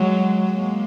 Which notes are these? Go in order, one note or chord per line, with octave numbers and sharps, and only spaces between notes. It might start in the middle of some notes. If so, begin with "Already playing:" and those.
Already playing: F#3 G#3
G#3 A#3